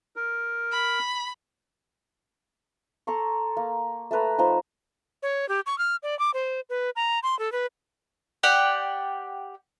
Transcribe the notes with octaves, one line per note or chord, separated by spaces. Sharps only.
A#4
B5
A4 A#5 C6 C#6
A#3
A3 A4 B4 A#5
F3 D#4 C5 A#5
C#5
G4
C#6
F6
D5
D6
C5
B4
A#5
C6
A4
B4
G4 D5 F#5 G5